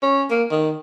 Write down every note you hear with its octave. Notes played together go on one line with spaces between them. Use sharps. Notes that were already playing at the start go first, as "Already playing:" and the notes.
C#4
A#3
D#3